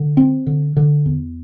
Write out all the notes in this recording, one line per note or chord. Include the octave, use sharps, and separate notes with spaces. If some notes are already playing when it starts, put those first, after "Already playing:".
Already playing: D3
C4
D3
D3
E2